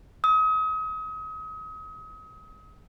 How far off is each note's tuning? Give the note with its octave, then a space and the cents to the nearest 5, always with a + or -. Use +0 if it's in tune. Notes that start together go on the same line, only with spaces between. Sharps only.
D#6 +35